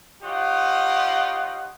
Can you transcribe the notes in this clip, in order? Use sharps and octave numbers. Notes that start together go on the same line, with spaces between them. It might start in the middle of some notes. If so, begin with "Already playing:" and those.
D#4 F4 G4 C#5 F#5